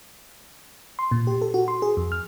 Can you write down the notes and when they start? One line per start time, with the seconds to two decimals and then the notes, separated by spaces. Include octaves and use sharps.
0.99 C6
1.11 A#2
1.27 G4
1.42 A4
1.54 F#4
1.68 C6
1.82 G#4
1.97 F2
2.12 F6